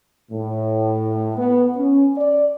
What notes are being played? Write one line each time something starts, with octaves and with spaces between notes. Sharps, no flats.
A2
B3
C#4
D5